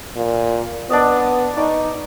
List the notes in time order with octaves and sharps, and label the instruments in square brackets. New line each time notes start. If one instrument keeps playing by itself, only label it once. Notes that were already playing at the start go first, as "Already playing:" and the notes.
[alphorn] A#2
[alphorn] B3 [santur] D4 D5 D#5
[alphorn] D#4 [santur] D5 C#6